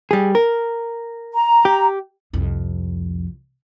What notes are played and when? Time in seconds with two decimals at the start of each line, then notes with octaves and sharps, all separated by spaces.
0.11 G3 G#4
0.35 A#4
1.33 A#5
1.65 G4
2.33 C2 F2